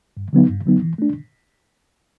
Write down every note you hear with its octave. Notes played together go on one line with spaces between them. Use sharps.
G2
D3 F#3 B3 D#4
G2
D3 F#3 B3 D#4
E3
A3 D4